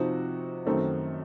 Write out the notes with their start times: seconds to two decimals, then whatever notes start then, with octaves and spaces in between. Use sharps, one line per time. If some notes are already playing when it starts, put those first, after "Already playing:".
Already playing: C3 F3 C4 D#4 F#4
0.65 F#2 D#3 A3 C4 D#4